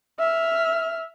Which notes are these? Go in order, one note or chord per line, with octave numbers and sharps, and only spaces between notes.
E5 F6